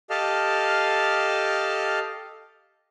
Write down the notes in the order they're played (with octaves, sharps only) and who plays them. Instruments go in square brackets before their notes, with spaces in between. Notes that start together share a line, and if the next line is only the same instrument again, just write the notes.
[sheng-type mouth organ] G4 A4 D#5 F5 A5 F6